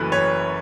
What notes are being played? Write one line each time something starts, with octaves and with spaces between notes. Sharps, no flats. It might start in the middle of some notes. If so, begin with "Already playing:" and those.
Already playing: F#1 F#2 E3 A3 B4
C#5